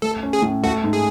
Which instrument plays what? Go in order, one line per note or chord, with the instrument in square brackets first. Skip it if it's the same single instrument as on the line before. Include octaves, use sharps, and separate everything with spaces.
[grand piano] A3 [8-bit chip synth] A4
[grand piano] C#4
[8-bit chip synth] G#4
[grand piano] A2
[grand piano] A3 [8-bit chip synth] F#4
[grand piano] G#2
[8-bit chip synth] G#4